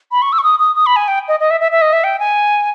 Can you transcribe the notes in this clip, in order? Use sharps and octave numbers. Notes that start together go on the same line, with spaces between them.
B5
C#6
E6
C#6
D#6
D#6
D#6
B5
G#5
G5
D#5
D#5
E5
E5
E5
D#5
E5
G5
G#5